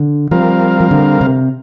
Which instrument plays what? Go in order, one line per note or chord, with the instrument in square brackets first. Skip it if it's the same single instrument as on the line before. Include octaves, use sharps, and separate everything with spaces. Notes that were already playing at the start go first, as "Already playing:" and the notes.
Already playing: [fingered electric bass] D3
[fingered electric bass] F3 [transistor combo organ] G3 C4 A#4 F5
[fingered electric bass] F3
D3
C3